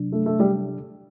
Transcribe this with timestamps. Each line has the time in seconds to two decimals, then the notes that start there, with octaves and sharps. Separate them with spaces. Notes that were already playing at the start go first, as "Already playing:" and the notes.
Already playing: C3 F#3 D4
0.12 A3
0.26 A3
0.40 G3